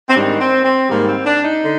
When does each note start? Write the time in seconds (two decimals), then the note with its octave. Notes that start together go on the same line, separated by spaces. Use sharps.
0.08 C4
0.14 G#2 D#3 G3 D4
0.39 C4
0.63 C4
0.87 G#2 D#3 G3 A#3
1.07 C4
1.25 D4
1.43 D#4
1.63 D3